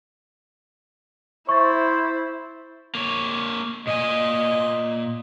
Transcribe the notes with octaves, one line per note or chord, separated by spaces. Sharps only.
E4 C5 E5 C#6 A6
A#3 C#5
A#2 D#5 G#5